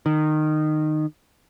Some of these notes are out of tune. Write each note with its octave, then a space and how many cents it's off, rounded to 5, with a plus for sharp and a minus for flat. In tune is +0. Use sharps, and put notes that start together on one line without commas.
D#3 -20